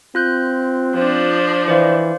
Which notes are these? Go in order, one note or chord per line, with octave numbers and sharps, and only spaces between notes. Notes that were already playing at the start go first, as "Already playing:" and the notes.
C4 F4 F#6 G6
F3 D4
E3 C5 D5 F5